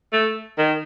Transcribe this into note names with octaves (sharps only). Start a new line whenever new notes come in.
A3
D#3